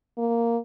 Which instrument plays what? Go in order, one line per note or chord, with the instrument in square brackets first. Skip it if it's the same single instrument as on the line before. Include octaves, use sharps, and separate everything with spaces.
[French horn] A#3